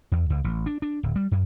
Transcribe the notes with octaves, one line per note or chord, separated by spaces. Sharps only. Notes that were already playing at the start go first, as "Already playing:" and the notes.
E2
C#2
A1
D4
D4
D1
G3
F#2